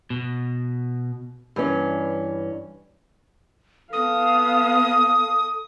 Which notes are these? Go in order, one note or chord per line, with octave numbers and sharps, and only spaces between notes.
B2
G2 E3 C#4
B3 A4 F5 D#6